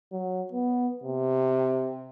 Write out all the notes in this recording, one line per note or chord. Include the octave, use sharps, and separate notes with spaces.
F#3
B3
C3